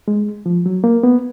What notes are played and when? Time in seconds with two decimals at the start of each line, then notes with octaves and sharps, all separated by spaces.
0.08 G#3
0.46 F3
0.66 F#3
0.84 A#3
1.03 B3